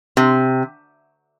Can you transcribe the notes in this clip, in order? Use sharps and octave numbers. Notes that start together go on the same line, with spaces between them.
C3